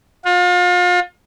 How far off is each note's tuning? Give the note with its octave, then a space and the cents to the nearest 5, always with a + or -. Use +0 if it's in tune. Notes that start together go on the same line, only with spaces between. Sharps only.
F4 +35